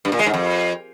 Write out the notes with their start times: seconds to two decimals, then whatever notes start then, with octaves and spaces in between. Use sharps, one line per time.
0.05 G2
0.12 A#2
0.19 G#3
0.26 G#2
0.34 F2